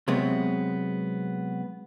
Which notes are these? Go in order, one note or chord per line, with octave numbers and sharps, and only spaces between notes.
C3 F#3 G#3 B3 C4